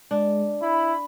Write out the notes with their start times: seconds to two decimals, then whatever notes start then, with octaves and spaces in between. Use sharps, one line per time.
0.11 G#3 D4
0.62 E4 B5